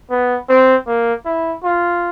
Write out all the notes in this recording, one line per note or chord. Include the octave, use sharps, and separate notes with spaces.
B3
C4
A#3
E4
F4